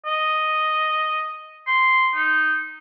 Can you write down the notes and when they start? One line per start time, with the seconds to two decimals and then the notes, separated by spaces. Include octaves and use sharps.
0.06 D#5
1.67 C6
2.15 D#4